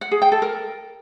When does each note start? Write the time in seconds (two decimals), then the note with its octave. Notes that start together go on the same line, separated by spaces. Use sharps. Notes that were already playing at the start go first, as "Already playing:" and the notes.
0.01 F#5
0.11 G#4
0.22 G5
0.32 A4
0.42 A#4